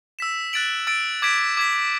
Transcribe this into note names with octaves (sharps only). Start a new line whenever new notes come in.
E6 B6 E7
F#6 A6 D7 F#7
E6 A6 D7
D6 G#6 B6 D7
D6 G#6 B6